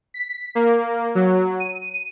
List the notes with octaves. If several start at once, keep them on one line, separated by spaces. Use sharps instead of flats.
B6
A#3
F#3
D#7